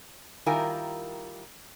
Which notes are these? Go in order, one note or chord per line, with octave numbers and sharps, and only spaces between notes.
D#3 G3 E4 F4 A#4 G#5